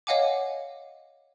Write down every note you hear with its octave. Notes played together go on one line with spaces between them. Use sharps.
C#5 D#5 F5 F#5 G#5 D6